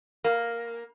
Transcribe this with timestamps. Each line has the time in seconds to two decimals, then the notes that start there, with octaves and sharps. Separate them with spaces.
0.24 A#3